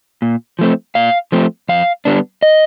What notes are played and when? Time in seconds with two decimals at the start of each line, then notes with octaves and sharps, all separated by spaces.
0.22 A#2
0.59 F3 A3 C4
0.95 A#2 F5
1.32 F3 A3 C4
1.69 F2 F5
2.05 D3 G3 B3 D4
2.43 D#5